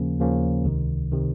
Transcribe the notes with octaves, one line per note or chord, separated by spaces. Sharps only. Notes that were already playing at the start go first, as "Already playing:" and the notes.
Already playing: D#2 C#3 F3 A#3 C#4
D#2 C#3 F3 A#3 C#4
C#2 C3 D#3
C3 D#3